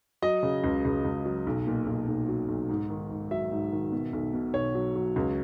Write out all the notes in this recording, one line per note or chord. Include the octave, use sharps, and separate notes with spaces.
F#3 D#5
C#3
C#2
C#2
C#2
F#3
B1
A#2
B1
B1
F#3
B1
G#2
D#3
G#2
F#3 E5
G#2
D#3
B2
B1
B2
B1 C#5
F#3
F#3
C#2